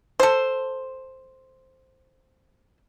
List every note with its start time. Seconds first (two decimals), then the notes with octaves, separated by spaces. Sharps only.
0.20 A4 C5